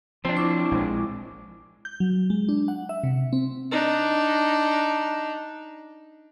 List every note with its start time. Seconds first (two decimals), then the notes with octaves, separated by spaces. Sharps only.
0.25 F3 C4 D4
0.36 E4 C#6 D6
0.71 A#1 G#3
1.85 G6
2.00 F#3
2.30 G#3
2.49 D4
2.68 F#5
2.89 E5
3.04 C3
3.33 C4
3.71 D4 D#4